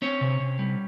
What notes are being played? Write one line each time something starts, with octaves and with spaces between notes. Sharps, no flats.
C4 C#4 C#5
C3
C3
G3